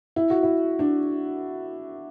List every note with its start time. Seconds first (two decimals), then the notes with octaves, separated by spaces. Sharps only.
0.16 E4
0.30 F#4
0.43 E4
0.79 D4